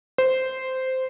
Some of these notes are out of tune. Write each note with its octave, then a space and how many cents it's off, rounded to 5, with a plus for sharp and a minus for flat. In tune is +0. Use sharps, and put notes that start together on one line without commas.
C5 -10